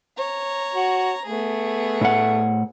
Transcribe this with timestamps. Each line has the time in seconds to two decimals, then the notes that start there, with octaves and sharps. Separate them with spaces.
0.18 C#5 A#5
0.75 F#4
1.26 A3 B3 G#4
2.01 A2 F#5